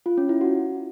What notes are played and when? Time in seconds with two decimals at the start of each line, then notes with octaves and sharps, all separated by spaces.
0.06 F4
0.17 C#4
0.29 E4
0.41 F#4